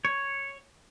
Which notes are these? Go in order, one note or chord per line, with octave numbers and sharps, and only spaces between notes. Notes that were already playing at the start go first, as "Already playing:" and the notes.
C#5